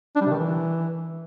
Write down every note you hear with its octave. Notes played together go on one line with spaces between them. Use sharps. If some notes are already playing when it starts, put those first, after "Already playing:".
D4
G3
C3
D#3
E3